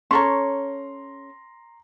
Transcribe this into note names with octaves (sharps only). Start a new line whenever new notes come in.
C#4 A4 C#5 A#5 C6